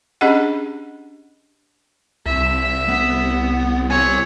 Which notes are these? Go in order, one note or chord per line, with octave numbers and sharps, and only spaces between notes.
C#4 D4 G4 G#4 D#5 F#5
C2 E5
B3
F4 C#5 G#5